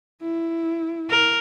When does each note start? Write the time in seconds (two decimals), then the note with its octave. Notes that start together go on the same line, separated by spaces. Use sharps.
0.21 E4
1.10 A#4